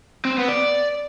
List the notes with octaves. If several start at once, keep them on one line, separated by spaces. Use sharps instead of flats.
C4
B3
D5